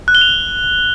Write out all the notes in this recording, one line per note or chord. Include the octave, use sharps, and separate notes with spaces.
F#6
G7
F7